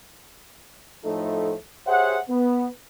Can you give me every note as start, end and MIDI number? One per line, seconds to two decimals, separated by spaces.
1.05 1.55 45
1.05 1.55 53
1.05 1.55 57
1.05 1.55 63
1.05 1.55 69
1.87 2.17 67
1.87 2.17 68
1.87 2.17 72
1.87 2.17 73
1.87 2.17 76
1.87 2.17 78
2.29 2.67 59